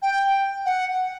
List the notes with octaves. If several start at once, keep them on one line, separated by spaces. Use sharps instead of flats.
G5
F#5